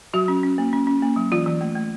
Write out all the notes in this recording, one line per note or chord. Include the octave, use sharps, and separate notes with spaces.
F#3 F#4
C#4
C#4
A#3
C#4
C#4
A#3
F#3
E3 F4
E3
A3
A3